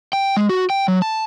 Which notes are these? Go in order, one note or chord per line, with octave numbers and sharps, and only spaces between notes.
G5
G#3
F#4
G5
F#3
A5